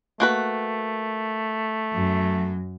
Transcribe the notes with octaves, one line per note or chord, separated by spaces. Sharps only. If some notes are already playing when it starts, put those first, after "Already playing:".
A3 A#3 F#4 B4
F#2 F#3